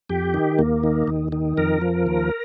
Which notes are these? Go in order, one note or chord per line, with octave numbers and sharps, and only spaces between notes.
F2 G4
D#3
D#2 A#3
D#3
D#2
D#3
F2 A#4
F3
D#2